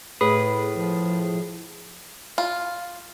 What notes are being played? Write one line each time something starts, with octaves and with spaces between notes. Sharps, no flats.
A2 G#4 B4
F3
F4